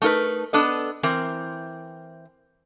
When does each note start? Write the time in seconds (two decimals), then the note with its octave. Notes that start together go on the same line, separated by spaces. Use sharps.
0.02 A3 D#4 F4 A#4 B4
0.53 B3 D4 A4 D#5
1.03 E3 C4 A#4